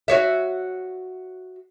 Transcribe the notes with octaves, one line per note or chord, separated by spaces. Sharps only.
F#4 C#5 E5